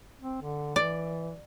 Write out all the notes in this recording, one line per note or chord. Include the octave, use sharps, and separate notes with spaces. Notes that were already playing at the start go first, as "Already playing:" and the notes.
C4
D3
E3 D5